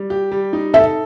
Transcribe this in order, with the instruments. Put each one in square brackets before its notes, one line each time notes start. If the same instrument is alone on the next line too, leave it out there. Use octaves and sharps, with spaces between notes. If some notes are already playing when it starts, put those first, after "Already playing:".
Already playing: [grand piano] G3
G4
G3
D#4
[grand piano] A4 [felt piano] E5